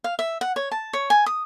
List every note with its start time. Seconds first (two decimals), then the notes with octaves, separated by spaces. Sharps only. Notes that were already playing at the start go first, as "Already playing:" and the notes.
0.04 F5
0.19 E5
0.41 F#5
0.56 C#5
0.71 A5
0.93 C#5
1.10 G#5
1.26 D#6